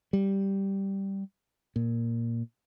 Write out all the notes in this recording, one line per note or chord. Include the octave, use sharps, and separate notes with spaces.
G3
A#2